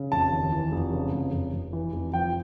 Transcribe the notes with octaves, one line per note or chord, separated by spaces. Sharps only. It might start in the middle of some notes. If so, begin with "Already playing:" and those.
Already playing: C#3
F1 A5
D#2
E3
F1
C#3
F1
F1
F1
E3
F1
F3 G5